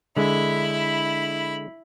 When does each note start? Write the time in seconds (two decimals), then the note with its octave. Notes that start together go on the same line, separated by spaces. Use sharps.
0.17 D3 G#3 E4 B5